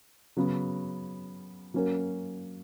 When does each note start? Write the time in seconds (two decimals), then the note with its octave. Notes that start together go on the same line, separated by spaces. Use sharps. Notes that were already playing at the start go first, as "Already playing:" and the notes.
0.37 C#3 F#3 B3
1.74 F#3 A#3 C#4 F#4 A#4